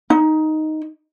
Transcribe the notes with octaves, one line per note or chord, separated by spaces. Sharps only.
D#4